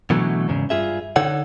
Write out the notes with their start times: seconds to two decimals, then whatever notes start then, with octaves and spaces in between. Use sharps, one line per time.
0.10 B2 D3 E3 F#3 A3
0.48 E2 G#2 C#3
0.70 G2 F4 G#4 E5
1.16 D3 D#4 A4 C#5 F#5